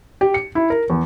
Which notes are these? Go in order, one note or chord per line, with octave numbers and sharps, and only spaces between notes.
G4
C#7
E4
A#4
E2